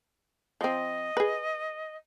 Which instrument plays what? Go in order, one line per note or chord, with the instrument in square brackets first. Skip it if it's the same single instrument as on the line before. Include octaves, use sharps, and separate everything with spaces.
[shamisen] F3 C4 [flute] D#5
[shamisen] G#4 B4